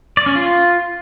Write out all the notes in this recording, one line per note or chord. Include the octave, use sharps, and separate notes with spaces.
D5
C#4
F4